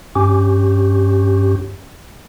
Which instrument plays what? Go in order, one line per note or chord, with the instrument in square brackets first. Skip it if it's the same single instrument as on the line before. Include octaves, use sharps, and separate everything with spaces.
[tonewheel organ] G2 C#4 G4